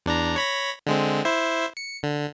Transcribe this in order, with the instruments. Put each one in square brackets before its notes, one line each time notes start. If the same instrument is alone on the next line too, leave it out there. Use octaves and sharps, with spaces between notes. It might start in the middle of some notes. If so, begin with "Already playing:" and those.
[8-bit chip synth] E2 D4 A#5
C#5 B5 A#6
D3 G#3 C4
E4 C5 E5
C#7
D3